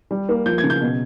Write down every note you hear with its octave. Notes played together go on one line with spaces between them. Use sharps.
G3
A#3
F3 G6
G#6
C#3
G6
B2